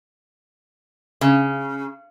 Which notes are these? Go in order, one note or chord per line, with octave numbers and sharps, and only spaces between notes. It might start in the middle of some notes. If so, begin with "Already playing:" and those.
C#3